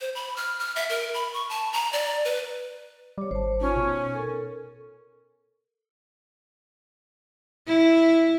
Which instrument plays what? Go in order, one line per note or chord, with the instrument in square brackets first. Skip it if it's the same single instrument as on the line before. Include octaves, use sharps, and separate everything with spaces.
[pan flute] C5
B5
F6
F6
E5
A#4
B5
C#6
A5
A#5
D5
B4
[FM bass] G3 [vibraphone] C#5 D6
[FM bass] G#1 [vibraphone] C5 A5
[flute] C#4 [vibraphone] D#4 F4
[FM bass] B2
[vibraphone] A4 A#4
[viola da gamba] E4